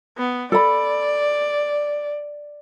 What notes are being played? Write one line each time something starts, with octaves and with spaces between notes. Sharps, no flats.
B3
A4 D5 B5